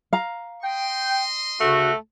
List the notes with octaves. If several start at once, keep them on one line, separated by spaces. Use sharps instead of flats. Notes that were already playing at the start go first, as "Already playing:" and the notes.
F5 A#5
D#5 G5 C6
D2 C#3 A3 F#4